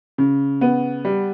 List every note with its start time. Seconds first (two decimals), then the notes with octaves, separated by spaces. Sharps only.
0.18 C#3
0.61 B3
1.05 G3